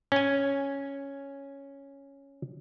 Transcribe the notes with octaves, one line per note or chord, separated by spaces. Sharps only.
C#4 G#5